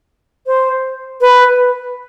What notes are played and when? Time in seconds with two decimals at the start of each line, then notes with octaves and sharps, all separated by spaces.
0.47 C5
1.21 B4